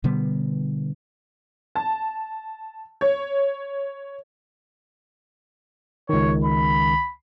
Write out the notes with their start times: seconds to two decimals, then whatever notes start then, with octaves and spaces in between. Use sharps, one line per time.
0.04 B2 D3 G3 B3
1.75 A5
3.01 C#5
6.09 C#2 D#3 C#5
6.44 B5